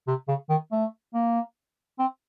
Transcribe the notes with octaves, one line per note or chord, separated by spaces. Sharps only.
C3
C#3
D#3
A3
A#3
C4